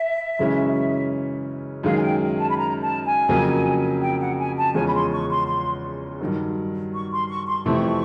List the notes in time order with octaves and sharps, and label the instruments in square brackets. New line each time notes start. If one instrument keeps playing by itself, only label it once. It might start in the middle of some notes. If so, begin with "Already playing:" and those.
Already playing: [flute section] E5
[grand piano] F#2 C#3 E3 G#3 C#4
[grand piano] F#2 D#3 G#3 [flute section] F5
[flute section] G#5
G5
A5
B5
A#5
A5
G#5
[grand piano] F2 C#3 F#3 A#3
[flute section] G5
F#5
G#5
A5
[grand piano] E2 C#3 F3 G#3 C#4 [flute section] G#5
[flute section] B5
C6
C#6
C6
C6
[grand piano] G2 D#3 F#3
[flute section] C#6
C6
C#6
C6
[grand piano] F2 C3 E3 A3 C4 [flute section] C#6